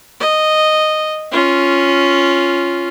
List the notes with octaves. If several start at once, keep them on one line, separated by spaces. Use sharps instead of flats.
D#5
C#4 F4